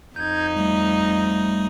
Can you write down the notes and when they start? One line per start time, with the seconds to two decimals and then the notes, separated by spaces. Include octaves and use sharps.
0.16 F2 D#4 G6 G#6
0.57 G3 A3